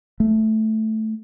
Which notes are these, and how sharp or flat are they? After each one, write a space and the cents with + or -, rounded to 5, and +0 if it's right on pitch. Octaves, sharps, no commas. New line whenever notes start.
A3 -5